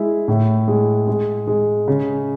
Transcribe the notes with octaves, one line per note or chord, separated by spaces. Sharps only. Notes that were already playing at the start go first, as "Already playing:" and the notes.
Already playing: G#3 E4
A2
G#3
G#3
G#3
C#3